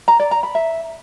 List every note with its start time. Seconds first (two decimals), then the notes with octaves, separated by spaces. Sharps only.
0.08 A#5
0.20 D5
0.31 A#5
0.43 B5
0.55 E5